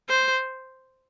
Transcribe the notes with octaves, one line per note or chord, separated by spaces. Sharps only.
C5